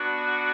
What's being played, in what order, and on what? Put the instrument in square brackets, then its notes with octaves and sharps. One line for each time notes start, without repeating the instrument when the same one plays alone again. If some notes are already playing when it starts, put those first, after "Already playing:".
Already playing: [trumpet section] B3 D4 F#4